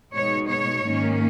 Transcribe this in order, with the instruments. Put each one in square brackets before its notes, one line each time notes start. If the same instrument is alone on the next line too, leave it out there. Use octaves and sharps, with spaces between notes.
[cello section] B2 G#3 D#4 C#5
C#5
G#2 D#3 A#3 C#4